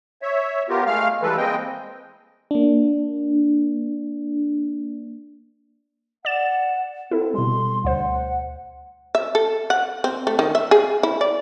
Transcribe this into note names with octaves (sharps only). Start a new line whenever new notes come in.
C#5 E5
B3 F4 G4 A#4
G#3 A3 F5 F6
E3 G3 G#3 A4 B4
G#3 A#3 C4 D#5 G5
A#3 D4
D5 F#5 A6 E7
C4 E4 A4
B2 G3 C6
D2 C5 F#5
E5
A4
F#5
C4
A3
D#3
E5
G#4
E4
D5